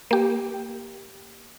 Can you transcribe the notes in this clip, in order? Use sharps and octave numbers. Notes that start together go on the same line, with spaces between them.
A#3 G4